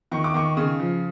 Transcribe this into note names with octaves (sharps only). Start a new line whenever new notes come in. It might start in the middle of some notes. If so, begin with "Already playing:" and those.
D#3 C#6
D6
D#3 C#6
C#3
F3